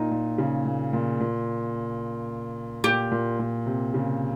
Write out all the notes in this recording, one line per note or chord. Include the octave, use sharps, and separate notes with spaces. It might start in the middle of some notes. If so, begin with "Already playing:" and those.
Already playing: A#2 D#4
A#2
C#3
A#2
A#2
A#2
A#2 G4
A#2
A#2
C3
C#3